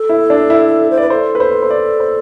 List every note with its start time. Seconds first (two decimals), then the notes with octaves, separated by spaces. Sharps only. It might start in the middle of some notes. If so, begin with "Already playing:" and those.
Already playing: A4
0.09 E4
0.30 D4
0.50 E4
0.91 C5
0.98 B4 D5
1.10 A4 C5
1.35 B4
1.40 C5
1.63 C5
1.70 D5
2.00 C5